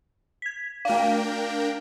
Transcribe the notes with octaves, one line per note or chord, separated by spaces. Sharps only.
G#6 B6
A3 D4 A#4 F5 G5